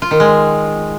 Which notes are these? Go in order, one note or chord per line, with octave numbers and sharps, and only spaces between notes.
F4
D#3
G#3